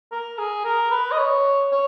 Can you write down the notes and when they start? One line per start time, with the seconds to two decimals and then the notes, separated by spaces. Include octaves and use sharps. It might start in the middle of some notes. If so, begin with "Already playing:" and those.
0.12 A#4
0.38 G#4
0.65 A#4
0.91 B4
1.11 D#5
1.18 C#5
1.72 C#5